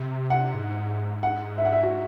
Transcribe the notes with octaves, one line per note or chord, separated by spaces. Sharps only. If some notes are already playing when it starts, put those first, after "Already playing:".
Already playing: C3
F#5
G#2
F#5
E5
F#5
E5
F#4